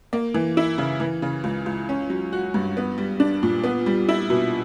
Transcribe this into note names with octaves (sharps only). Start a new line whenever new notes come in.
A#3
E3
E4
C#3
E3
C#3
C#2
C#2
C#4
F#3
F#4
G2
B3
G3
D4
A#2
B3
G3
E4
B2